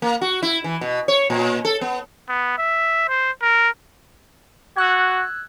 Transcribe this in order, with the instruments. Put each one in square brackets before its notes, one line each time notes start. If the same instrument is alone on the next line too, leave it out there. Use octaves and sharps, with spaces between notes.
[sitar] A#3
F#4
E4
E3
B2
C#5
A#2
A4
B3
[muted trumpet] B3
E5
C5
A#4
[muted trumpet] F#4 [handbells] E6 F#6 G#6